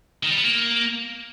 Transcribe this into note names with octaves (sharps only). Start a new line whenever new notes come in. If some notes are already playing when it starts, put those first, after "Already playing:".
D#3
G3
B3
A#3